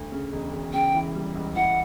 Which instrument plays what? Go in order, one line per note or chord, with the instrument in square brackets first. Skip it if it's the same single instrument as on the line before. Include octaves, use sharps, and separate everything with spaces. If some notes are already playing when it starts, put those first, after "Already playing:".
Already playing: [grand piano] D2
C#3
E1
E1
[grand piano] C#3 [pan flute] G5
[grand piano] E3
G3
C#2
[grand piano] E3 [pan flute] F#5